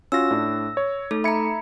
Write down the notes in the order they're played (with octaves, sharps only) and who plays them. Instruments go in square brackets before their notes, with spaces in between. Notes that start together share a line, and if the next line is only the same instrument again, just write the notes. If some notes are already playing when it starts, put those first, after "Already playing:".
[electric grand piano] C#4 F4 F#4 [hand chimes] E6 A#6
[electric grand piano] A2 D4
C#5
[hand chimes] A3 D#4 A4
[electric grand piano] E5 G#6 C#7 [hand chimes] A#5 B5